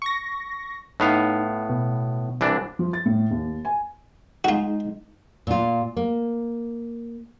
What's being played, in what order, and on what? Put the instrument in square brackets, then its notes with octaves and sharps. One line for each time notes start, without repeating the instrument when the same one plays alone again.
[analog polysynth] C#6 A#6
[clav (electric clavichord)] A2 B3 F5 [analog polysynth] D#4
[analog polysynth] B2
[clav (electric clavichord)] C2 E3 D4
[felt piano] F3
A6
A2
D#2
G#5
[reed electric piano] G#3 D#4 [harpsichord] F4 F#4
[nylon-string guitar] A#2 F4
A#3